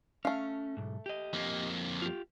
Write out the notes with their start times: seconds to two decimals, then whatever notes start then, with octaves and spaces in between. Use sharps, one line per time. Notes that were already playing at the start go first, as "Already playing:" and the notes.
0.25 A3 C#4 F5
0.77 B1 G#2
1.06 G4 D#5
1.33 F2 A#3
2.02 F4 G4